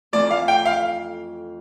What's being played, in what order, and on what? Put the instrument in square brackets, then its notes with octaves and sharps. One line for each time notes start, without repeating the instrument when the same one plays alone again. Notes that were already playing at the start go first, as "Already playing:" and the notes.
[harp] F2 E3 A3 C4 F4 [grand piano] D5
[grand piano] F5
G5
F5